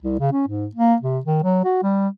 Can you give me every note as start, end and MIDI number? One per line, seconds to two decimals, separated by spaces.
0.02 0.17 36
0.20 0.31 49
0.32 0.45 61
0.48 0.67 44
0.75 0.95 58
1.02 1.19 48
1.26 1.39 51
1.43 1.61 54
1.64 1.82 66
1.83 2.08 55